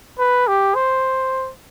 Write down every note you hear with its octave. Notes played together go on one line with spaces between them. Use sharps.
B4
G4
C5